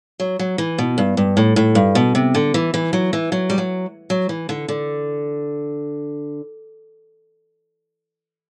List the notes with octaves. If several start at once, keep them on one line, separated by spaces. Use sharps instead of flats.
F#3
F#3
E3
B2
G2
G2
A2
A2
G2
B2
C3
D3
E3
E3
F#3
E3
F#3
G3
F#3
F#3
E3
D3
D3